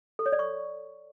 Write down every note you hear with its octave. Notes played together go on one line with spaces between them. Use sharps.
A4
C#5
D5
C#6